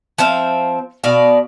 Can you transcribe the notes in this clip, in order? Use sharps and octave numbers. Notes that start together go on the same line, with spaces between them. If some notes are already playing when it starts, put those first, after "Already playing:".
F3 C4 E5 F5
B2 D5 F5